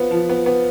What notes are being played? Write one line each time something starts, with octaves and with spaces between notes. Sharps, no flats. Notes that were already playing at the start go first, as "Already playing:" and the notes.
Already playing: B3 F4 C5 F5
F3
B3
B3